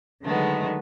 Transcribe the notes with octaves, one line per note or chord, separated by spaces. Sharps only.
D3 D#3 F#3 G#3 A3 B3